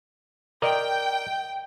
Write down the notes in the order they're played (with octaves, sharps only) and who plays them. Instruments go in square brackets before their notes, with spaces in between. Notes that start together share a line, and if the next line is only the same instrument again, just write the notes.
[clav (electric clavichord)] A#4 D5 D#5 [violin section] G5